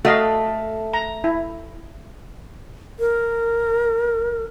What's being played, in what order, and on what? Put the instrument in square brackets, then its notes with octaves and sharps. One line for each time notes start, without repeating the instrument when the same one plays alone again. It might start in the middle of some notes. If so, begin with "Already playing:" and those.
[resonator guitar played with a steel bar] A3 [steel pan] F#4 D#5 F5
[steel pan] A#5
E4
[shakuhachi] A#4